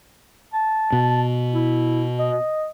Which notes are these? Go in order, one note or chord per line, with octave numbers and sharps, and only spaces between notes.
A5
B2
E4
D#5